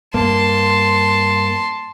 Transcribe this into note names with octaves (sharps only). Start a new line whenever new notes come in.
G2 A#3 A5 C6